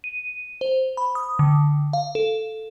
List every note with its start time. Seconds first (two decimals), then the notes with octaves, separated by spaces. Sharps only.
0.04 D#7
0.61 C5
0.97 B5
1.15 D#6
1.39 D3
1.93 F5
2.15 A4